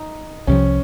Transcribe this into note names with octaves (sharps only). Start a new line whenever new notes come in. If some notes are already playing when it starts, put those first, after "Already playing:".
Already playing: D#4
C2 C3 F3 C#4